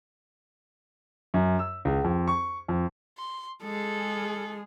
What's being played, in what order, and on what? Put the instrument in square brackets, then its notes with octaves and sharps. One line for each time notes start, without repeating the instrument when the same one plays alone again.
[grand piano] F#2
E6
C#2
F2
C#6
F2
[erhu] C6
[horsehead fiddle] G#3 G#4 [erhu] A4